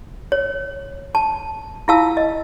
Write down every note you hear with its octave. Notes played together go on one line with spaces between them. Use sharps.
C#5
A5
E4 F4 F5 A5 E6
D#5